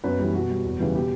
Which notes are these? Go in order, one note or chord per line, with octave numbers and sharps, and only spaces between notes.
F#2 B3 B4
E3 G3
B2 F#4
G3
E2
C#3 E3 G3
B2 G4